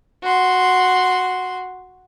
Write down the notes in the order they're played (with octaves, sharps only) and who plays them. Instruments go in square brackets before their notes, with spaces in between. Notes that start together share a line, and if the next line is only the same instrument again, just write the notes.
[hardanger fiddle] F#4 C6